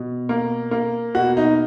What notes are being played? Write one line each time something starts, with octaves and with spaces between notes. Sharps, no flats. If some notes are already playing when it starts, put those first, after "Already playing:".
Already playing: B2
A#3
A#3
B2 F#4
D#4